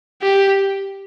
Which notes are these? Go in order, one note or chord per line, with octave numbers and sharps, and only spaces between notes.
G4